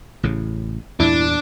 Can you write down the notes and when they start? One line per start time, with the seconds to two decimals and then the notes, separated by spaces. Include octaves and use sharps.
0.23 A1 A2 C#3
1.00 E2 G2 A#2 D4 E4